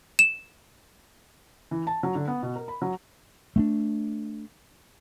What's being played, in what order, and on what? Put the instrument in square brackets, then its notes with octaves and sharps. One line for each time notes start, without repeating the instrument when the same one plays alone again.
[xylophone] E7
[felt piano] E3
A5
F#3
D3
B3
B2
A#4
B5
F#3
[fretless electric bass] A3 B3 D4